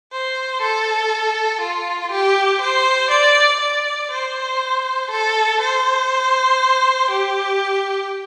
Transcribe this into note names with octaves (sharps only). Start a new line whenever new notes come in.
C5
A4
F4
G4
C5
D5
D5
C5
A4
C5
G4